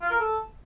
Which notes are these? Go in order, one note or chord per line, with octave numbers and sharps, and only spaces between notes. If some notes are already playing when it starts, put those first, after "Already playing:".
F4
A#4
A4